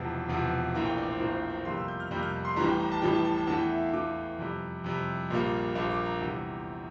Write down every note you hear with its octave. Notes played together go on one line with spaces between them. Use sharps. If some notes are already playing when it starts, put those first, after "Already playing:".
Already playing: E1 E2 C3 F3 A5
E1 E2 C3 F3
A#1 A2 E3 A#3 A#5
G5
D5
C5
A#1 A2 E3 A#3 A#4
C5
A#5
F2 C3 G3 A#3 C6
E6
G6
F6
F2 C3 G3 A#3 G6
F6
C6
A1 A2 E3 G3 A#5
G5
A#5
A5
A1 A2 E3 G3 G5
A5
A5
A5
E2 E3 A3 A5
G5
E5
F5
E2 E3 A3 D6
F2 C3 G3
F2 C3 G3
A#1 A#2 G3 A#3
A#1 A#2 G3 A#3 D6
D6
A#5
E2 C3 G3